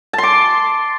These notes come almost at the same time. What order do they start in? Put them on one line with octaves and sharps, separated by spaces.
A5 C6 D6